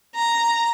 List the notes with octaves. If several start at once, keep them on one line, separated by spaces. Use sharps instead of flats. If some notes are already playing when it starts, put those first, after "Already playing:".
A#5